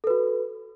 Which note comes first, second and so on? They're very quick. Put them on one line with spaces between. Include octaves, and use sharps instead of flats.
A4 B4 F#4